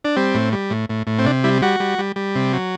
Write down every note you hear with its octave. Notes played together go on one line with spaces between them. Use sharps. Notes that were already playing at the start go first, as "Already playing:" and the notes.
D4
G3 C4
A2
G3
A2
A2
A2
C4
C3 D4
G3 E4
G3 F#4
G3
G3
G3
C3
F#3